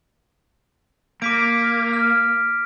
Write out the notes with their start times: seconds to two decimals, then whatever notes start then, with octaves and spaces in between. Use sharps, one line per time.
1.22 A#3 D6 B6 D7
1.93 F6